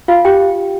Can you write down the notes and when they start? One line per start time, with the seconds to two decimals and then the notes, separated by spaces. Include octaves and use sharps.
0.08 F4 F5
0.25 G4 G5